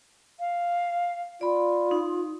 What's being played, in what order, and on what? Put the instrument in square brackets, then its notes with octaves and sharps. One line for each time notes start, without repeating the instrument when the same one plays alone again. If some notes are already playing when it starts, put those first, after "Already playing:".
[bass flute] F5
[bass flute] F4 [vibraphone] D5 B5
[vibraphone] D#4